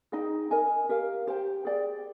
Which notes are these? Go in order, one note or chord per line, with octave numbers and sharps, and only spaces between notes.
D#4 G#4 D#5 G5
A#4 D#5 G#5
G4 A#4 F5
G4 C5 G5
G#4 D5 G5